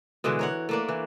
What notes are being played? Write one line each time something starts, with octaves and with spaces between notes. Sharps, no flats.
B2 D3 E3 G#3
A#4 C#5 F#5
A3 A#3 D4
E3